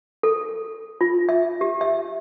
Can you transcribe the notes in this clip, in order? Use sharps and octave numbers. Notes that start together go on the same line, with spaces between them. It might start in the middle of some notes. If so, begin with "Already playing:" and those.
A4
F4
E5
G4
E5